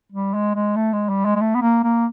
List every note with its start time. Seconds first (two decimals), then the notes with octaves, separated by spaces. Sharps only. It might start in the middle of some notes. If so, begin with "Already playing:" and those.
0.12 G3
0.34 G#3
0.55 G#3
0.76 A3
0.93 G#3
1.09 G3
1.25 G#3
1.36 G#3
1.41 A3
1.55 B3
1.62 A#3
1.84 A#3